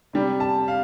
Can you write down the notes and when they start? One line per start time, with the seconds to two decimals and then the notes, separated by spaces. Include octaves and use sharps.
0.13 C3 G3
0.40 A5
0.68 F5